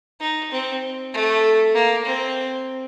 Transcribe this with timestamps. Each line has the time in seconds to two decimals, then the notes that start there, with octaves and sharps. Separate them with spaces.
0.21 D#4
0.51 C4
1.13 A3
1.74 A#3
2.05 C4